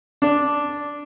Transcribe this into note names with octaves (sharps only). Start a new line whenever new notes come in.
D4